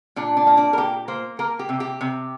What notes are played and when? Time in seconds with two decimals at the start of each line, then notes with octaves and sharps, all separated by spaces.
0.16 A#2 D4
0.37 D4
0.47 A#3
0.57 D4
0.73 A#4
0.77 A#2 G4
1.08 A#3 C5
1.39 A#3 A#4
1.59 G4
1.69 C3
1.80 G4
2.01 C3